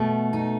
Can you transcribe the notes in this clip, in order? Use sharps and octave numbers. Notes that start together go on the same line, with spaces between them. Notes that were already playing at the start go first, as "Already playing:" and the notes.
Already playing: B2 A3
D#4